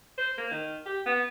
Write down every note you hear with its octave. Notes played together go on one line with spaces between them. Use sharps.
C5
A#3
D#3
G4
B3